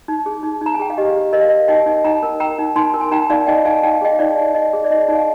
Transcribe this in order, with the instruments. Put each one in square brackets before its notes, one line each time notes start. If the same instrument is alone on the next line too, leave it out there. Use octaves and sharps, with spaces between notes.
[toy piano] D#4
G#4
D#4
D#4 A#5
G#5
G#4 G5
F5
G4 D#5
G4
A#4 D#5
F5
A#4 D#5
D#4 D#5 G5
D#4
D#4 G5 A#5
A#4
A#4 G5 A#5
D#4
D#4 G#5 C6
A#4
G#5
D#4 G5 A#5
D#4 D5 F5
D#4 D#5 G5
D#4 F5 G#5
D#4 G5
F5
G#4 D#5 G5
D#4 D5 F5
D#4
D#4 D#5
G#4
D5
D#4 D#5
D#4
F5